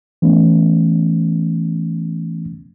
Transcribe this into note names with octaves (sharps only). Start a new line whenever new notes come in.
E3 A3 B3 C#4